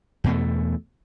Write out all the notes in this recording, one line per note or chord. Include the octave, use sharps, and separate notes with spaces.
E2 B2 A3